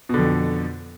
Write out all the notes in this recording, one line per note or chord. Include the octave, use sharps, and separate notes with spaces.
F2 B2 D3